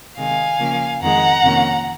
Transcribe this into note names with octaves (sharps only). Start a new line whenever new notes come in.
C3 D#3 G#3 F5 G#5
C#3 F3 A#3
F2 D#3 G#3 F#5 A#5
F2 C3 D#3 A#3 C#4